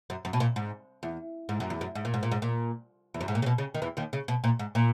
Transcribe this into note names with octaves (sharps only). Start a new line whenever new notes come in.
F#2
F#2
B2
A#2
G#2
E2
G#2
F#2
E2
F#2
G#2
A#2
G#2
A#2
G#2
A#2
E2
F#2
G#2
A#2
C#3
B2
C#3
D#3
E2 E3
D#2 D#3
C#3
B2
A#2
G#2
A#2